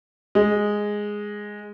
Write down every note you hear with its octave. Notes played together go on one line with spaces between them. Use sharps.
G#3